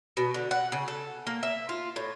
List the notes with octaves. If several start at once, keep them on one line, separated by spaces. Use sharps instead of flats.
B2
D3
F#5
C#3
A4
A#3
E5
F4
A2